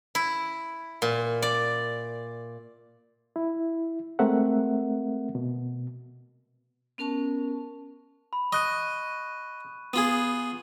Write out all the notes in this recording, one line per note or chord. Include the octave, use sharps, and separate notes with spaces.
E4
A#2
D5
E4
G#3 A3 C4 A#4 E5 F#5
B2
B3 C#4 A#4 A5 C#6
B5
D#5 C#6 F#6 D#7
B3 F4 G#4 D#7 F#7